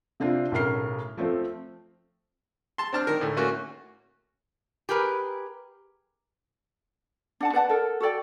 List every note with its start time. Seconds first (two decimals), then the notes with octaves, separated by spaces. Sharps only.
0.20 C3 C4 D4 F4
0.52 B1 A2 C#3 A#4 F6 C7
1.17 F3 A3 C4 C5
2.78 A5 C6
2.93 C4 D4 A5 F6
3.07 D#3 A#4
3.21 D2 A2
3.37 A3 A#3 C#4 F#4
4.89 G4 G#4 A#4 B4
7.40 D4 F#5 A5
7.53 B4 D5 F#5 A5
7.69 A4 A#4
8.00 F#4 A4 D5 G5